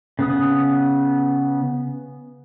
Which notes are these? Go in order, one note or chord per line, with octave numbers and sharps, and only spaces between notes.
C#3 B3 D#6